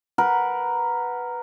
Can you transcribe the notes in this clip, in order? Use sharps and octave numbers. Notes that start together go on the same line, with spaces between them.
A#4 B4 F#5